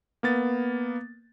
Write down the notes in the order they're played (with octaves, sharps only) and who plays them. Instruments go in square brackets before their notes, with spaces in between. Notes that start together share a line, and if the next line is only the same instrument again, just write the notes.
[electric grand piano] A#3 B3 A6